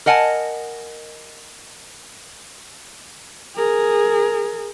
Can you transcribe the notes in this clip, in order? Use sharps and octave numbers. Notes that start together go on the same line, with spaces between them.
A#4 D#5 F#5 G#5 A5
G#4 A#4